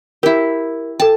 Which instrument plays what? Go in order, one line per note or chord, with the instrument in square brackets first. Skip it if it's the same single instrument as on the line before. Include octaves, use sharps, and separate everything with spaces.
[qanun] E4 G4 [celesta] A#4
[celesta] A4 G5 [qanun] A5